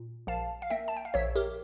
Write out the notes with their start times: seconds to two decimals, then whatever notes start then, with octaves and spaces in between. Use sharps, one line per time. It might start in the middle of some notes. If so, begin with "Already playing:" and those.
Already playing: A#2
0.27 A#1 F5 A5
0.62 F5
0.70 A#3 E5 G5
0.88 A5
0.97 G5
1.05 F5
1.14 A#1 C#5 E5
1.36 G4 A#4